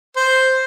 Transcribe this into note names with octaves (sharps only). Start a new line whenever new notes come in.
C5